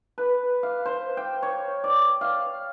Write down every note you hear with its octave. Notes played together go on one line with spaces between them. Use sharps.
B4
F5
C5
G5
C#5
D5
F5